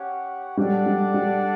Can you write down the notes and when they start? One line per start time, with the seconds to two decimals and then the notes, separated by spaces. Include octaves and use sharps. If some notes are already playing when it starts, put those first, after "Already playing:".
Already playing: C#4 G4 C#5 F#5
0.57 G3 D4 A4 D5 F#5
0.86 G3
1.14 G3